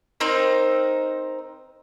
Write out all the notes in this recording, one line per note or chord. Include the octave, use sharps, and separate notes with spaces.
C4 D#4 A#4 C5